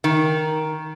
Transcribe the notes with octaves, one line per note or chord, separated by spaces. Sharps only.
D#3